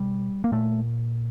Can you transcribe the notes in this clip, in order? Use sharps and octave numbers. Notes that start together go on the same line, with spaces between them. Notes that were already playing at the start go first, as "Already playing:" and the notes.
Already playing: B2 G3
A#3
A#2 A3